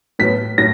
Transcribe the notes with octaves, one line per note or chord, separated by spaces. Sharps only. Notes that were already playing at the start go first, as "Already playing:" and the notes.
A2 F#3 B3 B6
A2 F#3 A#6